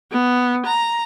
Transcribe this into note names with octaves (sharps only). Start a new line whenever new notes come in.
B3
A#5